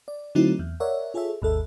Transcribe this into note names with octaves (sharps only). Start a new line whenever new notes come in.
D5
D3 F#3 A3 C4 D#4 E4
E2
A#4 C#5 D5 E5 F#5
F4 G#4 A4 C#5 E5
G#1 D#2 A4 E5